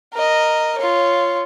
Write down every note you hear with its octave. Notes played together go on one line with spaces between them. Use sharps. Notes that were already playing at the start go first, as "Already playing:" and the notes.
A#4 D#5
F4 C#5